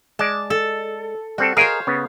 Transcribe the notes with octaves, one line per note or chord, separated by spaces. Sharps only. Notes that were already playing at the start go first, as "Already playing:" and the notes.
G#3 D5 A5
A4
G3 C4 F#4 A4
G#4 A#4 C5 C#5 D#5 F5
C#3 B3